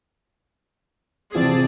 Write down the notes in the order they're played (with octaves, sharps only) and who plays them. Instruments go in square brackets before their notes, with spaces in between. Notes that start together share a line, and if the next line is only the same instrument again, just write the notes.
[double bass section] C3 C4 [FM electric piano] E3 E4 F4 [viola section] G#4 D5 A5